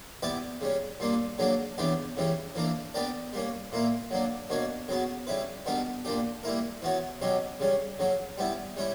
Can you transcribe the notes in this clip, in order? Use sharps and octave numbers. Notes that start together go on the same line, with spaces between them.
B3 E4 G4 B4 D5
C#3 G3 C#4
A#2 G3 A#3 D4
C#3 F#3 A#3 D4 A#4
C#3 E3 B3 D4 G4
C#3 E3 G3 C#4
E3 A#3 D4 A#4
B3 D4 G4 A#4 D5
G3 A#3 C#4
A#2 A#3 E4 A#4
F#3 A#3 D4
B2 A#3 D4 F#4 C#5
C#3 F#3 B3 F#4
C#3 G3 C#4 E4 B4
B2 G3 B3 D4 A#4
A#2 A#3 D4 G4
G3 A#3 E4 A#4
E3 B3 F#4 C#5
B2 F#3 C#4 G4
C#3 G3 C#4
C#3 F#3 C#4
G3 B3 E4
G3 C#4 E4